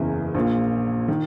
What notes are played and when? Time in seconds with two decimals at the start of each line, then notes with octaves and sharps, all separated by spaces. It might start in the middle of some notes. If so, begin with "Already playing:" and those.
Already playing: F#1 E2 C#3 E3
0.34 A#1 A#2
1.08 D#3